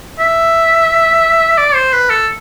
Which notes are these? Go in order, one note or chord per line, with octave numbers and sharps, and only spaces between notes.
E5
D5
C5
B4
A4